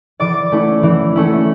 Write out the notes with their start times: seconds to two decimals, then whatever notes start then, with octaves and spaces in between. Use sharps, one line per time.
0.20 E3 D5 D6
0.52 A3 C#4 E4
0.83 E3
1.16 A3 C#4 E4